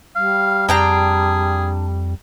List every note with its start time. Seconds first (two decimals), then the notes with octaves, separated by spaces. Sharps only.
0.16 G3 F5
0.69 F2 D4 G#4 G5 A#5